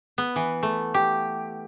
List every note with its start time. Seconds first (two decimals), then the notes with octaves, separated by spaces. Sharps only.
0.18 B3
0.36 E3
0.63 A3
0.94 G4